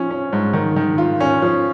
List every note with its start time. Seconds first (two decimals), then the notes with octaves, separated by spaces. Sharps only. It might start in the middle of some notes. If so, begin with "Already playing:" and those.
Already playing: F3 C#4
0.11 C#4
0.33 G#2
0.53 D#3
0.76 D#3
0.98 F4
1.20 C#4
1.42 F3